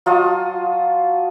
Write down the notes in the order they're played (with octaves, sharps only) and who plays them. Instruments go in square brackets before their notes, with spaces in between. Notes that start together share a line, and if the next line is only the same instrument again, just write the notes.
[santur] F#3 F4 D#5 A5